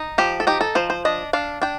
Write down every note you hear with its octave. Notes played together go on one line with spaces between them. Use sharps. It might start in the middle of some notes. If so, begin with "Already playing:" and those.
Already playing: D#4
F3 G4
A4
D#4 G4
A4
F3 C5
C5
D4 D#5
D4 F5
D4 G5